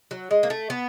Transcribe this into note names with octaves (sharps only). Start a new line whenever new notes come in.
F#3
G#3
A#3
A3
B3